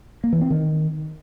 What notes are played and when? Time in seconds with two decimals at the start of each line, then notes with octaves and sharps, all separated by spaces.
0.24 A#3
0.33 E3
0.41 C4
0.50 D#3